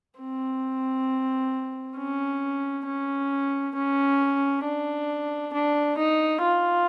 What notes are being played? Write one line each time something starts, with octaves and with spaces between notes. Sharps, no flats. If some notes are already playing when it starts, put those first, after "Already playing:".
C4
C#4
C#4
C#4
D4
D4
D#4
F4